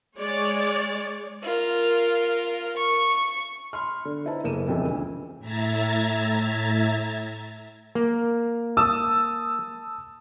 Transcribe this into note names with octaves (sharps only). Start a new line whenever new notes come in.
G#3 C#5 D5
F4 A#4
C#6
B5 C6 F6
D3
D#4 E4 B4 C5 A5 A#5
F#1 A#3 G#4 A4 D#7 E7
E1 F2 C3 C#4 G#4 A4
D2
A2 E5 A#5 G#6 A6
A#3
A5 D#6 E6